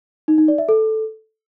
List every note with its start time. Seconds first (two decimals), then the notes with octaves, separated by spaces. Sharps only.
0.28 D#4
0.38 D#4
0.48 D5
0.58 E5
0.69 A4